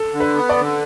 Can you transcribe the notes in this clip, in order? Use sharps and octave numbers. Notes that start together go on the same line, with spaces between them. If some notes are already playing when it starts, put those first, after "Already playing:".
Already playing: A4
D3
B4
B3
D5
D3